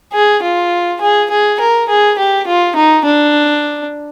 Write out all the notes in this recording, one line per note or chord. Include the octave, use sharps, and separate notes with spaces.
G#4
F4
G#4
G#4
A#4
G#4
G4
F4
D#4
D4